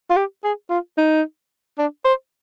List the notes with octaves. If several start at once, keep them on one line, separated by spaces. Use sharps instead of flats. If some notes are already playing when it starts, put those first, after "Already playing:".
F4
G4
G#4
F4
D#4
D4
C5